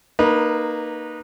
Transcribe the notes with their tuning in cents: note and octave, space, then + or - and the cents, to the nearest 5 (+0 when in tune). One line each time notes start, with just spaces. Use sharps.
A#3 +0 D#4 -15 B4 -20